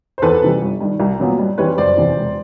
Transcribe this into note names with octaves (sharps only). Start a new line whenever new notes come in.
C5
E2 A4 B4
C3 E3 G3
G1
G2 D#3
C2
A#2 F#3 B3
G2
E3 G3 C4 B4 C#5
F#1 C5 D5
E2 C3 E3
E1